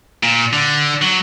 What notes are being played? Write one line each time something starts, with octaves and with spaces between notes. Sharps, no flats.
A#2
D3
F#3